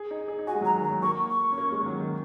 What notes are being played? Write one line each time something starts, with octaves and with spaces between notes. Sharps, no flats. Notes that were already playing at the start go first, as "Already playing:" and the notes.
Already playing: G#4
D#4
G#4
D#4
F#4 G#5
G#3
F#3 A#5
D#3
A#5
F#3
A#3 C#6
C#6
C#4
A#3
G#3
D#3
F#3
D#3